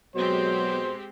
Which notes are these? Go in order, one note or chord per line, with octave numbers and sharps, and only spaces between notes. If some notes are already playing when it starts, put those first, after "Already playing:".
B2 F#3 G#3 C4 G4 C5